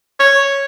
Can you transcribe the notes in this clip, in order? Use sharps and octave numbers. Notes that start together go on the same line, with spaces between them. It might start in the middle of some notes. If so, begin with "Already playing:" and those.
C#5